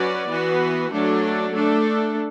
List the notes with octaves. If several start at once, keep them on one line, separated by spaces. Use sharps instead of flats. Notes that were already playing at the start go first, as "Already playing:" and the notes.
Already playing: F#3 C#4 F#4 B4 D5
E3 B3 F#4 B4
F#3 A3 D4 A4
A3 D4 A4